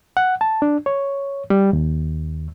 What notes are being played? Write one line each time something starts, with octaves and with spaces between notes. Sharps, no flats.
F#5
A5
D4
C#5
G3
D#2